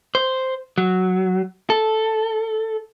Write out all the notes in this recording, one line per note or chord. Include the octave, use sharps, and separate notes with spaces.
C5
F#3
A4